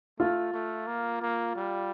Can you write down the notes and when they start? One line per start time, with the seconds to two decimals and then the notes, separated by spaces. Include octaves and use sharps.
0.20 A3 F4
0.54 A3
0.87 A#3
1.22 A#3
1.56 G3